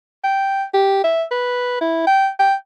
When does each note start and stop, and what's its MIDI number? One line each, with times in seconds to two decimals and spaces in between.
0.24 0.63 79
0.74 1.02 67
1.04 1.23 76
1.31 1.78 71
1.81 2.06 64
2.07 2.30 79
2.39 2.55 79